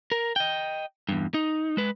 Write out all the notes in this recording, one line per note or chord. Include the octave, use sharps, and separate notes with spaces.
A#4
D#5 G5
E2 G2
D#4
G#3 B4